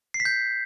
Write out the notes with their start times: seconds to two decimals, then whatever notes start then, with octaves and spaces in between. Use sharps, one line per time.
0.14 C7
0.20 B6
0.25 G6